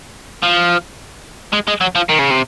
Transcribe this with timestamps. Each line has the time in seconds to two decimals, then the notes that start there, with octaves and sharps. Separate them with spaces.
0.42 F3
1.53 G#3
1.67 G#3
1.81 F#3
1.95 F3
2.09 D#3
2.19 C#3
2.30 C3